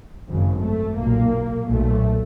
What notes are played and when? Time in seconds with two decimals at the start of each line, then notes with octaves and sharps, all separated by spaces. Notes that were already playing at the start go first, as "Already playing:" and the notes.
0.28 G#1 F#2 C#3
0.63 A3
0.98 B1 A#2 A#3
1.69 B1 A#2 A3